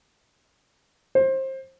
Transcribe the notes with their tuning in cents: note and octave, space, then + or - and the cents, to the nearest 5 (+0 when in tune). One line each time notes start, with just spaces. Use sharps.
C5 +25